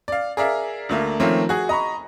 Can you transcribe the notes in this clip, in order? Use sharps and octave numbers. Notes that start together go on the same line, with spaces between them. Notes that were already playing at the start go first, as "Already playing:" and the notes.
D5 F5
G#4 A#4 D5 E5 F5
D2 A3 A#3
D#3 F3 A3 A#3 C4 C#4
F#4 G#4
D#5 A#5 B5 C#6